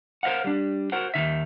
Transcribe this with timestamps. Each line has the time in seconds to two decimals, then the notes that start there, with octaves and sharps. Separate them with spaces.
0.23 A#4 C5 D#5 F5 F#5
0.44 G3 D4
0.92 F#4 A#4 C5 F#5
1.14 D#2 D#3 E5